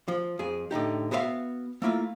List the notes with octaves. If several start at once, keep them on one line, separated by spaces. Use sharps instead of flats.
F3
F2 G#4
A2 D3 D#4 G4
B3 F#4 G4 C5 E5 F5
A3 A#3 E4 F4